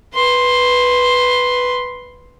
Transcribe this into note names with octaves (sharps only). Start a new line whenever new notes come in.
B4 C6